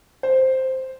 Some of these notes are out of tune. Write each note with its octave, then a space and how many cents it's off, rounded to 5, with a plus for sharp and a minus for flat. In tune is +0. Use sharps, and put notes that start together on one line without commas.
C5 +0